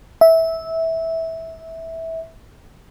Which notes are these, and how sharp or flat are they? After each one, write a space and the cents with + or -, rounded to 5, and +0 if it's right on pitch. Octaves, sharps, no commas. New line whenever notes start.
E5 -15